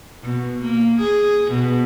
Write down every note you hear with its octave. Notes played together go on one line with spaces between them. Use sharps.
B2
A#3
G#4
B2